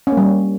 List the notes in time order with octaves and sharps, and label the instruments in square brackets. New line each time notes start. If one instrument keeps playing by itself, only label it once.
[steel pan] C#4
A#3
G3